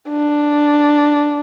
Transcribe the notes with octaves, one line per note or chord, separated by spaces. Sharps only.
D4